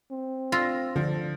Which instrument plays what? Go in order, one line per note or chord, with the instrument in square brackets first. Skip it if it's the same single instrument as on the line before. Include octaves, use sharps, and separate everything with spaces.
[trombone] C4
[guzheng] F4 [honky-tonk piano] E6 A#6
[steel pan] D3 D4 [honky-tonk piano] F3